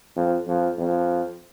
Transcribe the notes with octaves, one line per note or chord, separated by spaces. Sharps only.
F2
F2
F2